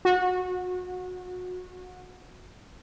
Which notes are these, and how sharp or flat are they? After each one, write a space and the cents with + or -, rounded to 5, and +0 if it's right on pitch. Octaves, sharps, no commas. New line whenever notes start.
F#4 -25